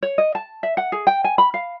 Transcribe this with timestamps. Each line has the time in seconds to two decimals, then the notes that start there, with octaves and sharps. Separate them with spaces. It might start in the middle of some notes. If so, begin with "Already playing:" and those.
0.03 C#5
0.18 D#5
0.35 A5
0.63 E5
0.77 F#5
0.92 G#4
1.07 G5
1.24 G#5
1.38 B5
1.54 F5